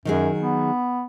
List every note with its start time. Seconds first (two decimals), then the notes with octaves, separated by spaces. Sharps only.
0.05 F#2 D#3 F#3 G#4
0.39 B3